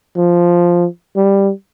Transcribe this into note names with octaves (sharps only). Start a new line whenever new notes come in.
F3
G3